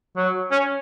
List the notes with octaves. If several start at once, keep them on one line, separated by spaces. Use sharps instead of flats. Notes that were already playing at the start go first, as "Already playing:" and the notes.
F#3
C#4